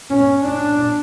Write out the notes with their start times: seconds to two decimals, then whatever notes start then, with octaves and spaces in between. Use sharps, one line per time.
0.10 C#4
0.43 D4